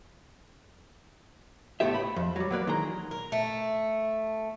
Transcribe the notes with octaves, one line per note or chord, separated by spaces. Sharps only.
C#2 A2 A3 B3 G4 E5
B5
F2
F#3 G3
F#3 A#3 B4 D5
D#3 E3 G#3 A#5
A#4
A3